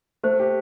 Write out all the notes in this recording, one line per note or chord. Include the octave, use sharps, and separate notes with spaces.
A3 C5
G4